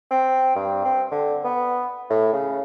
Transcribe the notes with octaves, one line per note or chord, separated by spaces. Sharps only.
C4
G2
C4
D3
B3
A2
C#3